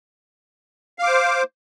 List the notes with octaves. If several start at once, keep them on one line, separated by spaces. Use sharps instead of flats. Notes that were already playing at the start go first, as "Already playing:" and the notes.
C5 F5 D6